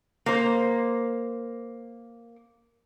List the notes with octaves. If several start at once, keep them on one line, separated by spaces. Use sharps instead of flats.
A#3 C5